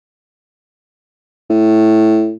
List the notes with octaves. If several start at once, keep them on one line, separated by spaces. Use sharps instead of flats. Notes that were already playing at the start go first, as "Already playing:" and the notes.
A2